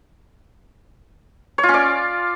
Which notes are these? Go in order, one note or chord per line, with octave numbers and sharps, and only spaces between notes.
C#5
F4
C#4
D5